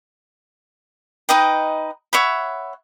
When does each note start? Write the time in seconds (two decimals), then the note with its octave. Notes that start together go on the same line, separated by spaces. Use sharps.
1.29 D#4 B4 D#5 G5
2.13 C#5 E5 F#5 B5